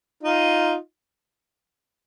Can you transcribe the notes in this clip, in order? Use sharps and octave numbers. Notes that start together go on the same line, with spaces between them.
D#4 F4